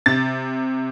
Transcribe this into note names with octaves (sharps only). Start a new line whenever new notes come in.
C3 A6